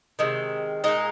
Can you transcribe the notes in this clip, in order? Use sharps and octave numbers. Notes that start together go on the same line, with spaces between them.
C3 D#3 G#3
A#2 G#3 D#4